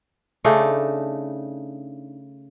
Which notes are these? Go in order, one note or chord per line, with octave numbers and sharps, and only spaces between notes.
C#3 A3 D4 D#4